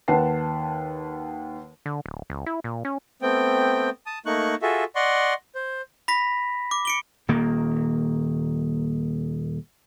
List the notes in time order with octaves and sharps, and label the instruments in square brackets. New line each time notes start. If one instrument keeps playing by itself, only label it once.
[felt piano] D#2 B4 F#5 A5 C7
[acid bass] D3
D1
C#2
E4
A#2
C#4
[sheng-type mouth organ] A3 B3 C4 G5
A5 D#6
A3 A#3 D#4 C#6 F#6
F4 F#4 G#4 A4 E5
D5 D#5 F#5 C6 C#6
C5
[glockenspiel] B5 A#6 B6
D6
C#7 D7 G7
[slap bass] D#1 D#3 A#3